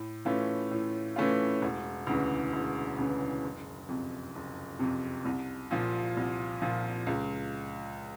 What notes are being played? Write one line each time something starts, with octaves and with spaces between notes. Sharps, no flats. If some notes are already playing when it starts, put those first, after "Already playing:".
Already playing: A2
E3 A3 C#4 F4
A2
E3 A3 C#4 F4
E1
D2 C#3 E3
E1
D2 C#3 E3
F#1
F2 C3
F#1
F2 C3
C2
A#2 F3
C2
A#2 F3
C#2